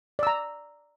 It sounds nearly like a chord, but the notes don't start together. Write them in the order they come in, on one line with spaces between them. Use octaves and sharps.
D5 E6 A#5